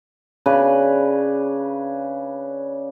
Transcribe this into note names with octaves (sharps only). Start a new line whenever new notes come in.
C#3 D4 B4